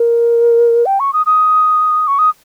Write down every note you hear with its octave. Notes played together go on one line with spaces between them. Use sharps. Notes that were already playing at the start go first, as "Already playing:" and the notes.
Already playing: A#4
G5
C#6
D#6
D#6
C#6
D#6